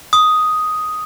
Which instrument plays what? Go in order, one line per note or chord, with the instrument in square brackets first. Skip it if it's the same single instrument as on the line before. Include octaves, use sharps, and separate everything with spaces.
[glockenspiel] D#6